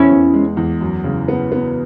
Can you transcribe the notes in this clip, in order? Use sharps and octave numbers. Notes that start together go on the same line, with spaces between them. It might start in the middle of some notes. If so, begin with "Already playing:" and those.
Already playing: E2 B3 C#4 E4
E2
G#3
E2
F#2
C#3
B3
B3